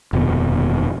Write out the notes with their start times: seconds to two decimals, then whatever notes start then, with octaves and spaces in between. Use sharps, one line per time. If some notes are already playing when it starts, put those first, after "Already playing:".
0.13 F1 D#2 B2